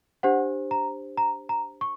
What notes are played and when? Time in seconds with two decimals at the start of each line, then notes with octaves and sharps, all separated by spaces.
0.23 D4 G4 C5 F#5
0.71 A#5
1.18 A#5
1.49 A#5
1.81 C#6